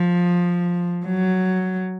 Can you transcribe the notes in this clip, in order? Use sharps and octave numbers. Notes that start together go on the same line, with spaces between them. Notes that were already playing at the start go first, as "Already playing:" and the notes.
Already playing: F3
F#3